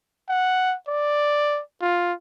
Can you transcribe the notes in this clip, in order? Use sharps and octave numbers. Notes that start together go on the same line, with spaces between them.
F#5
D5
F4